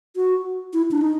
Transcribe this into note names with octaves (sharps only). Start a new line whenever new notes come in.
F#4
E4
D4
D#4